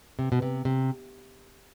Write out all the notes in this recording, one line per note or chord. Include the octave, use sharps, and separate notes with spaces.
C3
B2
C3
C3